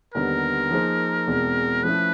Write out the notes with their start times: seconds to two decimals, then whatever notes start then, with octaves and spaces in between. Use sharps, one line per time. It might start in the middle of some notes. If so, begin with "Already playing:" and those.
0.14 D#2 D3 G3 B3 D#4 A#4
0.70 F3 A#3 D#4 G#4 C5
1.27 E2 B2 G#3 C4
1.83 F3 A3 C#4 E4 A4 B4